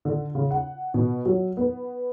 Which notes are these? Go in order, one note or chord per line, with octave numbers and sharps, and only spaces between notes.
D3
C#3
F#5
B2
F#3
B3